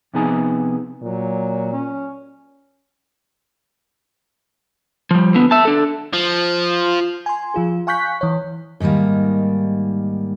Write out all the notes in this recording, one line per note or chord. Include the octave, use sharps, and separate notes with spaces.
C3 F3 B3 D#4 G#4 G#5
A#2 F#3
C#4
F3 G3
D3 B3
E5 A5
D4 A4
F3
G#5 C6
F3 F4 G#4
F5 G#5 C#6 F#6 G6 B6
E3 C#5
G#2 D#3 F#3 G3 A#3